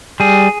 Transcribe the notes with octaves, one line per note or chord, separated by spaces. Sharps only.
G3 G#4